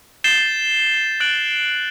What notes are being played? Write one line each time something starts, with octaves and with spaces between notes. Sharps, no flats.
G6 A6 C7 E7 G7
F#6 A6 D7 F#7